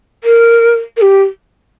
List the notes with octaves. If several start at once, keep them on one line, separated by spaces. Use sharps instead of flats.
A#4
A#4
G4